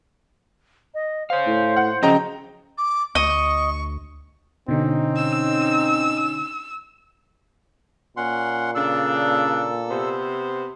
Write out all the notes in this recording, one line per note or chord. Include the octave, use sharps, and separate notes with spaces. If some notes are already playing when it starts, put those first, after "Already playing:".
D#5
C5 C#5 F5
A2
F#5
C#3 F3 F#3 D#5 G5 A#5
D6
D2 D#5 C#6
B2 D3 C4 C#4 D#4
E6
A#2 C#4 F#5 C6
C#3 D4 A4 E6
C3 B3 C5